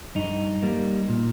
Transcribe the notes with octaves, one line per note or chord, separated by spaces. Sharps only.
G2 D#4
G3 A#3
A#2